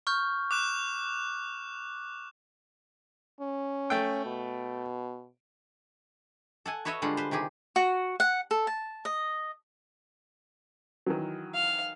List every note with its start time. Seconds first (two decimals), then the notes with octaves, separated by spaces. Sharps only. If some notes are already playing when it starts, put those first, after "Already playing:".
0.07 C#6 F6 G6
0.51 D6 F#6 E7
3.41 C#4
3.90 A3 G5
4.25 B2
6.66 A4 F#5 G#5
6.85 F#4 B4 C#5 D#5 E5
7.02 D3 G3 G#3 F4 F#5
7.17 B4 C5
7.31 C3 D#3 G4 G#4
7.76 F#4
8.20 F#5
8.51 A4
8.67 A5
9.05 D#5
11.06 D#3 E3 F#3
11.54 F5